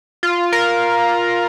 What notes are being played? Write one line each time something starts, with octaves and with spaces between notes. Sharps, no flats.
F4
A#4